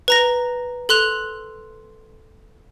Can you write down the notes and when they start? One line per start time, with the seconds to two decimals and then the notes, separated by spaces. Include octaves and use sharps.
0.08 B4 A#5 A#6
0.89 A4 C6 F#6 F7